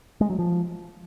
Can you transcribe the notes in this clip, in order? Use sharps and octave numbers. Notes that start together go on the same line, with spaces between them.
G#3
F#3
F3